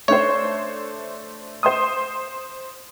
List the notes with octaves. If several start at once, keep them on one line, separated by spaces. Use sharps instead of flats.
A3 D4 C5 C#5
C5 C6 D#6